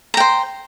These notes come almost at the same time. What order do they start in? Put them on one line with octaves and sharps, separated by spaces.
A#5 G5 C5